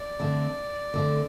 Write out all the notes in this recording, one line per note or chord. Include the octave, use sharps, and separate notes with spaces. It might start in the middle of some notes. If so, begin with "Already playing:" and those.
Already playing: D5
D3 A3 C4
D3 A3 C4